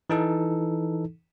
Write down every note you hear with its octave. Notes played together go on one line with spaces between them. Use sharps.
E3 D#4 A4